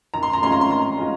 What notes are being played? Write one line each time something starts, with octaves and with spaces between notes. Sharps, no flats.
D#3 A#5
C6
A#5
G#3 C#4 F4 C6
A#5
C6
D#3 A#5
G#3 C#4 F4